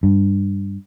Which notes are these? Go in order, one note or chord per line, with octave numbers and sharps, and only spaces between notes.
G2